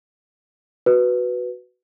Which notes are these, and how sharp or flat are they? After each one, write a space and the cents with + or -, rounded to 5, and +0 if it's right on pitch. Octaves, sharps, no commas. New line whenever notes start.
F#4 +0 B4 +0